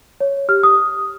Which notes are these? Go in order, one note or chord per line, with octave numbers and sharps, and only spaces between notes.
C#5
G4 F6
D#6